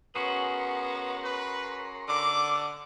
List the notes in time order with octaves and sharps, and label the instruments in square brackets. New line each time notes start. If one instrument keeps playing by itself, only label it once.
[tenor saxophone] B3 [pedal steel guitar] C#4 F#4 G#4 [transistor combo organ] A#4 C#5 C6
[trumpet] B4
[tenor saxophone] D3 [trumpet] D6